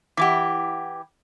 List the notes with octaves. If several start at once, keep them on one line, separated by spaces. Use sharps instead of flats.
E3 E4 G4 F#5 D6